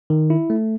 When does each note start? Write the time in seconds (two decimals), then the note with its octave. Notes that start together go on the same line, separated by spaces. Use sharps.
0.10 D#3
0.30 E4
0.50 A3